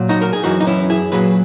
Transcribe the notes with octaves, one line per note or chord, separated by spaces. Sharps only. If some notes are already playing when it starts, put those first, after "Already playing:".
Already playing: A#2 F#3
D#4 F#4
A#4
G#4
F#2 E3 D#4 F#4
D#4
C#4 E4
E4 G#4
A#2 F#3 G#4 B4